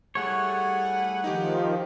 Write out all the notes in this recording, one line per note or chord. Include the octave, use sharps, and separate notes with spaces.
G3 A3 E4 G#4 C#5 F#5
D#3 F3 D#4 G4